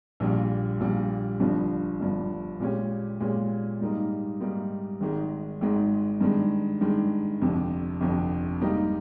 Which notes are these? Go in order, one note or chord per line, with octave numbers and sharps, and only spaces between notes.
A#1 A#2 G3
A#1 A#2 G3
G1 G2 F3
G1 G2 F3
A#2 G#3 C#4 G4
A#2 G#3 C#4 G4
G#2 G3 A#3 D#4
G#2 G3 A#3 D#4
G#1 G#2 D#3 G#3
G#1 G#2 D#3 G#3
G2 D#3 G#3
G2 D#3 G#3
G1 F2 C3
G1 F2 C3
G#2 G3 A#3 D#4 G4